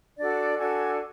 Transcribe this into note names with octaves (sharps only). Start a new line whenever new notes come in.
D4 F#4 A4 D5
D4 F#4 A4 G#5